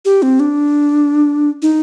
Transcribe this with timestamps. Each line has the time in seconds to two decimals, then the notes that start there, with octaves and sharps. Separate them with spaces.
0.05 G4
0.22 C4
0.40 D4
1.62 D#4